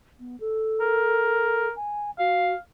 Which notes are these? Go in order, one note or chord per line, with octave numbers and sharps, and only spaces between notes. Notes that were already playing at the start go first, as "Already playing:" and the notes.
B3
A4
A#4
G#5
F#4 F5